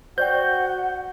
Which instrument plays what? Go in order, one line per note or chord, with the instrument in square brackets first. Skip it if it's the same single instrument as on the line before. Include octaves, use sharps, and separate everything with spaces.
[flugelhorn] F#4 [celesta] C5 D5 G5 [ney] F#5 [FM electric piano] G6